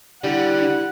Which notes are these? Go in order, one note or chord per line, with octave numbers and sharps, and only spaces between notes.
D3 G3 E4 F#5